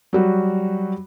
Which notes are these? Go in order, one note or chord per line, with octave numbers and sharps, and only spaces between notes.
F#3 G3 F#4